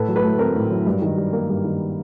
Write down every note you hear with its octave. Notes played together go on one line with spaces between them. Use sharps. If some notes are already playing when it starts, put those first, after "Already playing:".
Already playing: A2 A4 B4
F#3
A4 B4
A3
C4 A#4
A2
F#3
G2
D#3
G3
A#3
G2
D#3